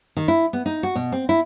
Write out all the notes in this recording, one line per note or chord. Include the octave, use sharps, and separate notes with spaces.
D#3
E4
B3
D#4
F#4
B2
C4
E4